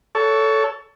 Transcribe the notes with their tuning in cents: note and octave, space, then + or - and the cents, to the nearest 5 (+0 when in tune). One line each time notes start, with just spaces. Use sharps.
A4 +0 C#5 +25